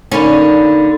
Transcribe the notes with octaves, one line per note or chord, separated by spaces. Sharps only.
D3 A#3 C#4 D#4 B5